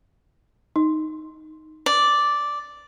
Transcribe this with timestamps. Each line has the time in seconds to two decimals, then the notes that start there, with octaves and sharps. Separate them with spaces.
0.76 D#4
1.86 D5